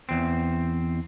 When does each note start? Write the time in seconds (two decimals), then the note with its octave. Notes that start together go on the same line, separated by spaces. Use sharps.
0.09 E2 C4